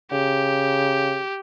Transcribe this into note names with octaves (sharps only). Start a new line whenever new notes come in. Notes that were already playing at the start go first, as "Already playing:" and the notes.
C#3 G4